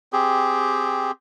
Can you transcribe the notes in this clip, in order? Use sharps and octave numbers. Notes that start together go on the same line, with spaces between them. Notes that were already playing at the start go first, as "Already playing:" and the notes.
C4 G4 G#4